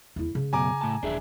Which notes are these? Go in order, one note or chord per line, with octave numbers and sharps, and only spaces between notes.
E2 E4
C#3
F#2 B2 G#5 A#5 D6
A2 A5
D#1 E3 D4 G#4 E5